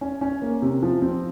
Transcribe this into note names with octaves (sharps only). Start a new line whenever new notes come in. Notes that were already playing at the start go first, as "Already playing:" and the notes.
C#4
C#4
A#3
C3
F3
C4